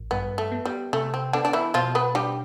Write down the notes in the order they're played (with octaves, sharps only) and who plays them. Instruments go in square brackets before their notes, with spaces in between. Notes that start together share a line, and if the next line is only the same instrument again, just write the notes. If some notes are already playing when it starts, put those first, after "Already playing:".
Already playing: [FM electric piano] A1
[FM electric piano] G2 [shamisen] B3
[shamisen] A3
[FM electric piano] B3
[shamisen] G3
[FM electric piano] C3 [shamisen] A3
[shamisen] C4
[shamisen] D3 D4 [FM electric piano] B3
[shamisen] D4
E3 E4
[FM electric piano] B2 [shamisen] F3 F4
[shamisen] B3 B4
[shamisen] G3 G4 [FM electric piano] D4